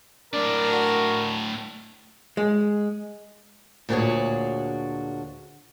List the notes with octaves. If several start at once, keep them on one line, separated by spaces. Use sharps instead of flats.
A2 D4 A#4 D5
F#4
G#3
D2 A#2 D4 F#4 G#4 C#5